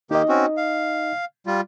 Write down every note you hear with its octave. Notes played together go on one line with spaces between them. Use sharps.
D#3 A#3 D#4 G4 D#5
C4 C#4 F#4
F5
G3 F4